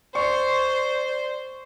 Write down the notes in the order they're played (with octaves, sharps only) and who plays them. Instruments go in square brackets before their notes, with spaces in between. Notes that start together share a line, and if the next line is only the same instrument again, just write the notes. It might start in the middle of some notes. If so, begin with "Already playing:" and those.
[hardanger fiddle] C5 [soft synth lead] D5 [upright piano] C#6